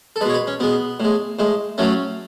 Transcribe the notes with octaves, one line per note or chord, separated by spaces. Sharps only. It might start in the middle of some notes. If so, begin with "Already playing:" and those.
A4
B2 G#3 B4 C#5
B4
C#4
B2 G#3 B3
A2 G#3
A2 G#3
A2 F#3 A3 C#4